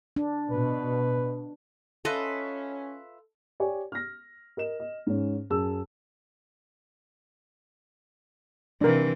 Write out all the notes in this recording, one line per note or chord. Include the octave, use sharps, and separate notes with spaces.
D4
B2 B4
C#4 F4 A4 B4 D#5 E5
G4 C#5 D5 G#5
F6 A#6
A#4 D#5 E7
D#5
G#2 C#4
F#2 G#4 A5 E6
C3 E3 D4 A#4